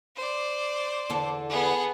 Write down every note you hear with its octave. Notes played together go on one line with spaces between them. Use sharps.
C5 D5
E2 D3 A4
B3 G#4